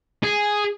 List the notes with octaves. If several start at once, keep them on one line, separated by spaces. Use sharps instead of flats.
G#4